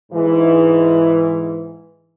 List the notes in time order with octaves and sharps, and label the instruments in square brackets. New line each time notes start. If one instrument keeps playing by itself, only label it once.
[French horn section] G#2 E3